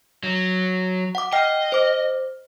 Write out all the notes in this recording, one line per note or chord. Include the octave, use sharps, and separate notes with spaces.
F#3
F#5 D6
D#5 G5 F6
C5 D6